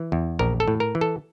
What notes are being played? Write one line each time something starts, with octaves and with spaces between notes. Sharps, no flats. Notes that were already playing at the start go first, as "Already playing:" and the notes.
Already playing: E3
E2
A#1 A#4
A4
A2
A#4
E3
A4